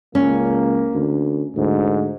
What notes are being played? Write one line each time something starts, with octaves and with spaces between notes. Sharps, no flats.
C#2 A#3 C#4
D2
D2 G#2